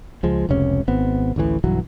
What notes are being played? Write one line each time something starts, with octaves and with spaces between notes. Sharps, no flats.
C#2 F3 G#3
F1 C#2 C3 C#4
G#1 B3 C4
A1 D2 A2 E3
B1 G2 E3 F#3